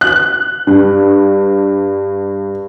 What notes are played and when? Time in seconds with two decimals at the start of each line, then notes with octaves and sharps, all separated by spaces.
0.01 F#6
0.67 G2